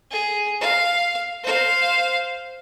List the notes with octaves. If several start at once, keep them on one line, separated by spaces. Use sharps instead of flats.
G#4
F5
C5 F5